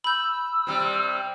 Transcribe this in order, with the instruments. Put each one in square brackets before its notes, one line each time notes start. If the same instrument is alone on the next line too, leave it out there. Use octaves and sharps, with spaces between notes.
[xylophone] B5 G6 [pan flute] E6
[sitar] C3 G3